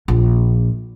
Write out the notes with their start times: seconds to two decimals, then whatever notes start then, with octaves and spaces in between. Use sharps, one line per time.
0.08 A#1